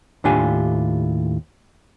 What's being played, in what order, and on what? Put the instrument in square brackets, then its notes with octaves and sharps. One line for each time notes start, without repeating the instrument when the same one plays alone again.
[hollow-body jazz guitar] D#2 A2 D4 F4 G4 G#5